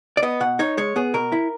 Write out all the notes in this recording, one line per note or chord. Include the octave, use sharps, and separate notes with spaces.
D5
B3 D#5
B2 F#5
D#4 C#5
G#3 C#5
B3 G#4
B2 A#4
E4